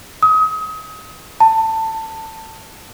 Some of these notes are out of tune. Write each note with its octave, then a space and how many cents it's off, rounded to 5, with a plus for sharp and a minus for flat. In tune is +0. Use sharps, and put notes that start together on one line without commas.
D#6 +35
A5 +20